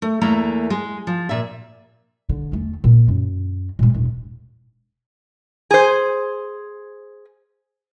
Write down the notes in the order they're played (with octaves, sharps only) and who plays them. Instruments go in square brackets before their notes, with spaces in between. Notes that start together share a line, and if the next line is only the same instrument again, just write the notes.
[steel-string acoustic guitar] A3
E2 A3 A#3 E4 B4 A#5
G#3
F3
A#2 E5
[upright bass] D3
E2 A3
A#2
F#2
A#2 G#3
E1 A2
[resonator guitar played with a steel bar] G#4 C5